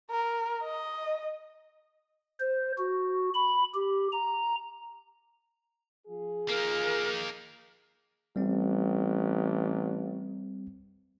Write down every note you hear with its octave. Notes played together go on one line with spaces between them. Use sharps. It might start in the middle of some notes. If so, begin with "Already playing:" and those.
A#4
D#5
C5
F#4
B5
G4
A#5
F3 F4 G#4
A#3 D#4 A#4
A1 G3 C4